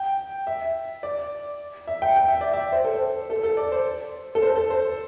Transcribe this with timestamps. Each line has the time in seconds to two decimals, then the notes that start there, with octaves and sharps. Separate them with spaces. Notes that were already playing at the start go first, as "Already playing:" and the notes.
Already playing: G5
0.47 E5
1.03 D5
1.87 E5
2.02 G5
2.16 G5
2.28 E5
2.41 D5
2.53 E5
2.72 C5
2.85 A4
2.95 C5
3.30 A4
3.43 A4
3.57 D5
3.72 C5
4.35 A4
4.42 C5
4.56 A4
4.70 C5